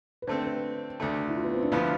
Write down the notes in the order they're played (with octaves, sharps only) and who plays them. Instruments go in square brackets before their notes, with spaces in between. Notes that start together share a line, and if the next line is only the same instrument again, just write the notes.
[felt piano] B4
[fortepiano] D3 A3 C4 [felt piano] C5
[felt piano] B4
[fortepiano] D2 D3 A3
[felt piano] E4
F4
B3
C4
D4
[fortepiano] D2 D3 F3 B3 F4 [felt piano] E4